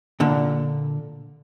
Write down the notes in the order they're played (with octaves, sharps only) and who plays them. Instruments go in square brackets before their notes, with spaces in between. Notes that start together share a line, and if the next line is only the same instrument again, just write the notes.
[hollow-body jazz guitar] A#2 D3